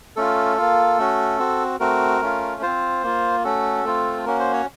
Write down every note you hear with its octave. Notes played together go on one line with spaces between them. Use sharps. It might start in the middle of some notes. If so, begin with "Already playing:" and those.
A3 C#4 F4 A4
A#3 F4
A3 C#4 F#4
C4 F#4
A3 C4 F#4 A#4
A3 C#4 F4
C4 F4 C5
A#3 F4
A3 C#4 F#4 A4
A3 C4 F4
A#3 C#4 F#4 A#4
C5
C#5